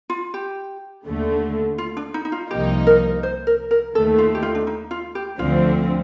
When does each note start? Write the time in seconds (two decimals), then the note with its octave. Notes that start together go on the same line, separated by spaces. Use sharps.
0.10 F4
0.34 G4
1.06 D#2 D3 A3
1.78 F4
1.97 D4
2.14 D#4
2.25 D#4
2.32 F4
2.51 C2 C3 F3 A#3 D#4 G4
2.87 A#4
3.23 C5
3.47 A#4
3.71 A#4
3.95 D#2 D#3 A3 A4
4.18 F4
4.35 G4
4.43 F4
4.55 D4
4.67 D#4
4.91 F4
5.15 G4
5.38 D2 D3 F3 C4 F4